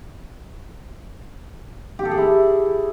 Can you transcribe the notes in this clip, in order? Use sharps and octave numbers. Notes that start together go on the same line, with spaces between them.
G4
A4
G#4
E4